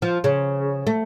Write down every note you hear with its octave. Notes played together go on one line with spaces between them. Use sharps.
F3
C#3
A3